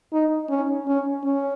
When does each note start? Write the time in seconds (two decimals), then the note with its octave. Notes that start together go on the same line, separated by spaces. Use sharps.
0.13 D#4
0.50 C#4
0.88 C#4
1.24 C#4